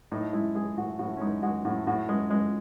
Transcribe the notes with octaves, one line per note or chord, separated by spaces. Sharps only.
A2 D#4
G#3 E4
G#3 G#4
A2 F#4
A2 F#4
C#4
G#3 D#4
G#3 F#4
A2 F#4
A2 F#4
G#3
G#3